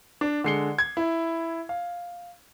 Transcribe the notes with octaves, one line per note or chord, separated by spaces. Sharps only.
D4
D3 G#3 C7 C#7 G7
G#6
E4
F5